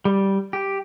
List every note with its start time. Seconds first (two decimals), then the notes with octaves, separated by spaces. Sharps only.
0.05 G3
0.53 G4